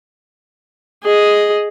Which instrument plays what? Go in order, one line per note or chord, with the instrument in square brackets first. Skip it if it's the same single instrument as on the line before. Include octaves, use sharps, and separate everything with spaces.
[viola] G#4 D#5